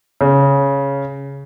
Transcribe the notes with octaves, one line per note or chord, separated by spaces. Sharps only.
C#3